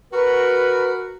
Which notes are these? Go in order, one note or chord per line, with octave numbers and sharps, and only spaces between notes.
F#4 A#4 B4